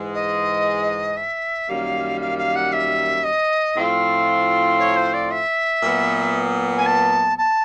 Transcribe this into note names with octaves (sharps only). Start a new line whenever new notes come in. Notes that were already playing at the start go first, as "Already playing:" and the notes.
Already playing: G#2 E3 G#3
D#5
E5
F#2 D#3 G3 A#3 F5
F5
F5
F#5
E5
D#5
A2 F3 A3 C4 F4
C#5
C5
D5
E5
A#2 F#3 B3
G#5
A5
A5